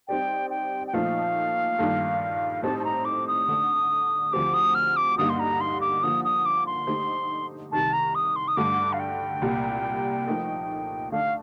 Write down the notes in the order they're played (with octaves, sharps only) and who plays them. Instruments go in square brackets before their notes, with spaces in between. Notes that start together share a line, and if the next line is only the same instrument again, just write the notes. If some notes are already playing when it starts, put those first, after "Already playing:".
[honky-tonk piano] G3 C4 D#4 G4 D5 [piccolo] G5
[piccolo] G5
G5
[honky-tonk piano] A#2 F3 A3 D#4 [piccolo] F5
[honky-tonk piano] G2 D#3 A#3 F4 A4
[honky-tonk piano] A2 A3 C4 D#4 G4 [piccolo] A5
[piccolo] A5
A#5
D6
D#6
[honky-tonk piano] D3 A3 D4
[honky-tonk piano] D2 D3 F3 C4 G4 [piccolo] D6
[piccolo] D#6
F6
D6
[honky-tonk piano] G2 D3 G3 A#3 D#4 [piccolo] D#6
[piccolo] C6
A#5
C6
D6
[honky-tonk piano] D3 F3 A#3 [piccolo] D#6
[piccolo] D#6
D6
C6
[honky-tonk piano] D3 A3 D#4 G4 C5
[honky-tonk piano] C2 C3 D#3 [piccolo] A5
[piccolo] A#5
D#6
C6
D#6
[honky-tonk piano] G2 D3 A3 [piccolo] D6
[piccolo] F5
G5
[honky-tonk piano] C2 A#2 G3
F3 A3 D#4 A#4
[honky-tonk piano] D3 A3 D4 [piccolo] F5